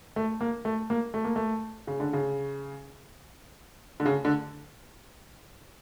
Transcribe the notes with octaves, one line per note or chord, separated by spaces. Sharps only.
A3
A#3
A3
A#3
A3
A#3
A3
C#3
D3
C#3
D3
C#3
D3